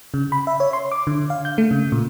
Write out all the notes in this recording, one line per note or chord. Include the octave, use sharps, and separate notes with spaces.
C#3
B5
E5
C#5
C6
D6
D3
F5
G6
A3
C#3
A#2